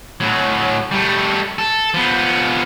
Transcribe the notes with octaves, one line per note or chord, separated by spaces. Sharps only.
A2 F#3
G3 A3
A4
F3 B3